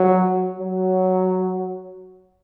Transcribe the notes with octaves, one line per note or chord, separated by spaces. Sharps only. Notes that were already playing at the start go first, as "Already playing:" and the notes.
Already playing: F#3
F#3